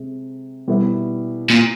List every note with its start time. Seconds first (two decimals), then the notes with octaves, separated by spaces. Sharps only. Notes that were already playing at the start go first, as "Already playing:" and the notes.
Already playing: C3 G#3
0.68 B2 G3 B3 E4
1.50 A#2